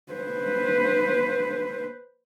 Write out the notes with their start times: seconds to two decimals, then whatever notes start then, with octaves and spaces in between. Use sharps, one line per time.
0.13 B4 C5